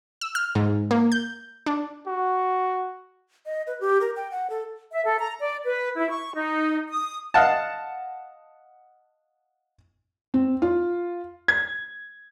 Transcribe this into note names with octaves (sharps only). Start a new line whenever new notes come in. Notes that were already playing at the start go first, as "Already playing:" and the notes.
E6
F6
G#2
A#3
G6
D4
F#4
D#5
B4
G4
A#4
G5
F#5
A4
E5
A4
A#5
D5
B4
E4
C#6
D#4
D#6
D#5 F5 F#5 A5
C4
F4
G#6